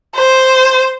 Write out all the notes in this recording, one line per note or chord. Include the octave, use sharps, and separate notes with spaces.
C5